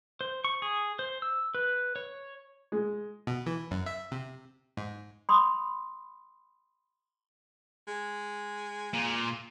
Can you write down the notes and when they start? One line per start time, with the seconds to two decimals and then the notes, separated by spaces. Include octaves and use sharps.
0.21 C5
0.45 C#6
0.62 G#4
0.99 C5
1.22 E6
1.55 B4
1.96 C#5
2.72 G#3
3.27 B2
3.46 E3
3.71 F#2
3.86 E5
4.12 C3
4.77 G#2
5.29 B5 C6 D#6
7.88 G#3
8.93 A#2